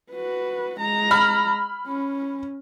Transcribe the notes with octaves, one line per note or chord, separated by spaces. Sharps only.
F#4 B4
G#3 A#5
B5 F6
C#4